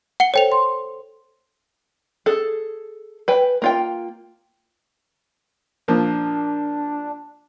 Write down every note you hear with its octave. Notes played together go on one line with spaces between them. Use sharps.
F#5 C#7 G7
A4 C5 C#5 G5 F7
C6
G#4 A4
B4 G5 G#5
A#3 F4 G5
A#2 F3 A#3 D4